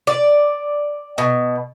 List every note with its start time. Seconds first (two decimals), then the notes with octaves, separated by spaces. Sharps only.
0.07 D5
1.18 B2